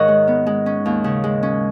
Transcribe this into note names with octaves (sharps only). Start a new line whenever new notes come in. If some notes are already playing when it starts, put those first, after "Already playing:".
Already playing: G#2 D#3 A#4 C#5 D#5 F#5
G#3
B3
G#3
C#4
D#2
C#3
G#3
C#4